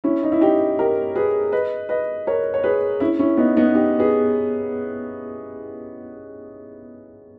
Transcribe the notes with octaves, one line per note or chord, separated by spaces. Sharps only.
C#4 E4
D#4
E4
D#4 G4
G4 A#4
G#4 B4
B4 D#5
B4 D#5
A#4 C#5
C#5
G#4 B4
C#4 E4
C#4 E4
B3 D#4
B3 D#4
D#4 G4
G#4 B4